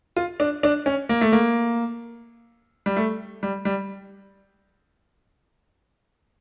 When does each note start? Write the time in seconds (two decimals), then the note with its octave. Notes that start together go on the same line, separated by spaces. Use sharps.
0.16 F4
0.40 D4
0.63 D4
0.86 C#4
1.09 A#3
1.21 A3
1.32 A#3
2.86 G3
2.96 A3
3.43 G3
3.65 G3